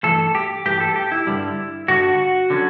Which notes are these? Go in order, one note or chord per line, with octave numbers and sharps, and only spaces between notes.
G2 E3 A3 A4
G4
G2 E3 A3 G4
A4
G4
E4
G2 D3 G3
G2 D3 G3 F#4
D3 F#3 C#4